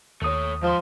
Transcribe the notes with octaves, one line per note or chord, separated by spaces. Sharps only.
D#2 A3 C#5 D#6
G#2 F3 C6